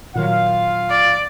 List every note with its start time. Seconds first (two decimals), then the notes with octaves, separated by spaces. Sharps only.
0.15 A#2 D#3 F#3 F4 F5
0.90 D5